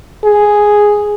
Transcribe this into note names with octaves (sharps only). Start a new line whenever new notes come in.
G#4